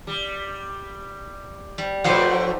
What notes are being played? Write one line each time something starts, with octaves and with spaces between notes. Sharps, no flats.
G3
G3
F3 F#3 A3 D#4 G4 B4 C5 F#5